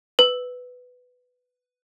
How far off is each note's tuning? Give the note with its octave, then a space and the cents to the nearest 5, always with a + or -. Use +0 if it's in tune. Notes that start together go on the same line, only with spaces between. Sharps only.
B4 +10